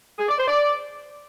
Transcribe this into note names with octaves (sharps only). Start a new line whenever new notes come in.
G#4
D5
C5
D5